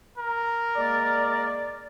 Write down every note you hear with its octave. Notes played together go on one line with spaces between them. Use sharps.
A#4
G#3 A#3 D5